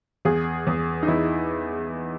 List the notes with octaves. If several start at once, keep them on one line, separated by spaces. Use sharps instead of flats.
E2 G#4
E2
D#4
E2 E4